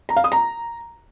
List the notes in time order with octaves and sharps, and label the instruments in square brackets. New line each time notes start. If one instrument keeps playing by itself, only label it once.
[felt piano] A#5
F5
D#6
A#5